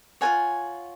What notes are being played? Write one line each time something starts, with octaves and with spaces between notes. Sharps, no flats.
F4 A#4 C#5 F#5 G#5